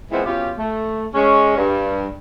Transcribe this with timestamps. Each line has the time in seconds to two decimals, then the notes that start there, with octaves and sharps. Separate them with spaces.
0.12 A#2 E3 G#3 B3 C4 C5
0.25 B2 C#4 F4 G4
0.58 A3
1.15 G#3 C#4
1.57 G2